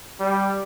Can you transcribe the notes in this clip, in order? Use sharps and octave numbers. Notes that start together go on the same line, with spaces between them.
G3